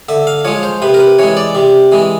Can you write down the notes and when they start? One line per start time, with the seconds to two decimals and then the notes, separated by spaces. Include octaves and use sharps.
0.09 D3 E5
0.27 F5
0.45 F3 G#3 C#5
0.63 C5
0.82 C3 B4
0.94 A#4
1.00 B4
1.19 E3 G#3 C#5
1.37 D5
1.55 C3
1.92 E3 G#3